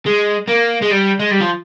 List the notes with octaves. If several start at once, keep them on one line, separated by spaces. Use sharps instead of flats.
G#3
A#3
G#3
G3
G#3
G3
F3